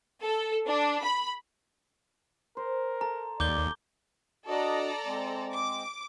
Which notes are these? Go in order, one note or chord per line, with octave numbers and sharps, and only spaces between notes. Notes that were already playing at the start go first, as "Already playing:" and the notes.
A4
D4
B5
A#4 C5
A4 A#5
D#2 D5 D6 G6 G7
D4 F#4 A4 D5 D#5 A#5
G#3 C4
D6